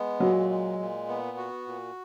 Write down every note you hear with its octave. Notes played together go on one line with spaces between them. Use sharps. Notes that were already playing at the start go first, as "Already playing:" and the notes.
Already playing: G#3 B3
A#2 F#3
G#3
A#2
B3
F#4
A#2